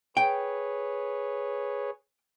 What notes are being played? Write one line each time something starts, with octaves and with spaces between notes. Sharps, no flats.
G#4 B4 C#5 G5